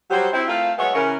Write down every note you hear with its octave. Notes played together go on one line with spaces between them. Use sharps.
F#3 G3 C5
C4 E4
A3 C4 F4 A#4 F5
F#3 G#3 B3 C#5 E5 F#5
C#3 E3 C#4 E4 A#4